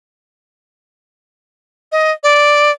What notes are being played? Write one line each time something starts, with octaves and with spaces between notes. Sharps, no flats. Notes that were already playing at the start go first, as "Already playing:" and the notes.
D#5
D5